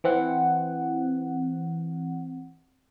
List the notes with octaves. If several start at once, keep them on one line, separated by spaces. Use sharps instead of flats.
E3 C4 F#5